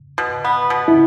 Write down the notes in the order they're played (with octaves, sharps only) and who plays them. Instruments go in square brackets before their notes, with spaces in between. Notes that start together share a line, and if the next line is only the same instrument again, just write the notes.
[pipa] B2
B3
B2
[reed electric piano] E4